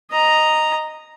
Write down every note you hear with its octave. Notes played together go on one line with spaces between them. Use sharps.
D#5 A#5